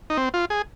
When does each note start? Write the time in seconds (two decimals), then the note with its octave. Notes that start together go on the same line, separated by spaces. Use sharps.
0.10 D#4
0.17 C4
0.34 F4
0.50 G#4